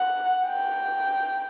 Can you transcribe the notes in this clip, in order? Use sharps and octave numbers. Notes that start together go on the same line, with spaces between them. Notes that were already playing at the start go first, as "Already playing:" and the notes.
Already playing: F#5
G5